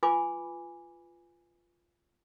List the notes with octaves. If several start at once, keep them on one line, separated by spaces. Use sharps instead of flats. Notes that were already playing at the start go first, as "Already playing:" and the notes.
F4 B4 G#5 B5 D6